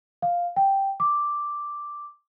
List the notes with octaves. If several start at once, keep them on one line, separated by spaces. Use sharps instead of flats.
F5
G5
D6